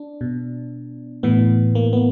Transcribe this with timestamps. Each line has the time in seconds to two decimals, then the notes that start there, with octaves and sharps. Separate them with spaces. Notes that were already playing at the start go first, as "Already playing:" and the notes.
Already playing: D4
0.21 B2
1.23 A2 E3 B3
1.75 A#3
1.93 B3